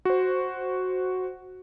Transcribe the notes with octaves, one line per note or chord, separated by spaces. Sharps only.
F#4 C5